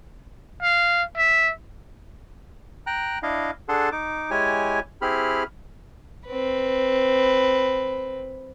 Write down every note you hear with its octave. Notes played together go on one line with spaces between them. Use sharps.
F5
E5
G5 A#5 F#6
D4 E4 D#5 F5
D4 G#4 A4 F#5 A5 C6
D#4 D6
G#3 E4 G4 C#5 G#5
C4 E4 G4 G#4 B5 F6
C4 B4